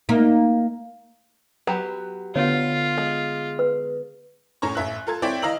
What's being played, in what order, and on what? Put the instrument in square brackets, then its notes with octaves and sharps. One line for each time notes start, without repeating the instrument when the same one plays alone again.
[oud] A#3 D#4
[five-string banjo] F#3 G4 [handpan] B4
[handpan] D3 B3 [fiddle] F4 [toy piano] C#5
[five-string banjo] G#3
[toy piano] B4
[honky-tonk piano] A2 C#4 A#5 C#6
A1 E5 F#6
F4 A4 G#6
C4 E4 C#5 D5 G5
E3 D#5 F5 A#5 E6 F#7